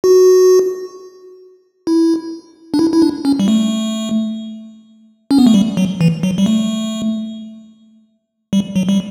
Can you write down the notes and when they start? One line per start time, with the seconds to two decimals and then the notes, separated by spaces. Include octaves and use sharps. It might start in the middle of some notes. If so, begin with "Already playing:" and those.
0.04 F#4
1.87 E4
2.74 D4
2.79 E4
2.93 E4
3.02 D4
3.25 C#4
3.40 G3
3.48 A3
5.31 C#4
5.39 B3
5.47 A3
5.54 G3
5.77 F#3
6.01 E3
6.23 F#3
6.38 G3
6.46 A3
8.53 G3
8.76 F#3
8.89 G3